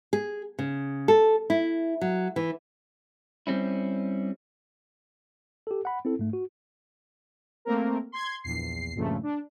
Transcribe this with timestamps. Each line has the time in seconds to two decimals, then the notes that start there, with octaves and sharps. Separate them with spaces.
0.13 G#4
0.59 C#3
1.08 A4
1.50 E4
2.01 F#3
2.36 E3
3.47 G3 C4 C#4 E4
5.67 G4 A4
5.85 F#5 B5
6.05 C4 E4 A4
6.19 G#2 A3
6.33 F#4
7.65 A3 A#3 C4 A#4
8.12 C6 G#6
8.44 A#1 E2 C7
8.94 C#2 G2 A#2 C#3 F3 A3
9.23 D4